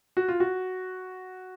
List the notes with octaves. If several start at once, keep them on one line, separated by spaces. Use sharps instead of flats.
F#4
F4
F#4